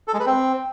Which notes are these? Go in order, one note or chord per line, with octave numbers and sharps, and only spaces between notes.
A4
G#3
B4
C4